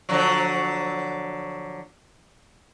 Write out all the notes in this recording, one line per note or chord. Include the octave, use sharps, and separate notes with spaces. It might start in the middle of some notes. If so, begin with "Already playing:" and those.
D3 F3 F#3